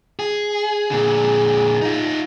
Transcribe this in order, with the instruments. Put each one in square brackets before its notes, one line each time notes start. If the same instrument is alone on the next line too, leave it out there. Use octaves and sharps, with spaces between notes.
[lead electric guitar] G#4
[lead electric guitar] A#2 D3 [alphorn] G#4
[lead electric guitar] D#4 F4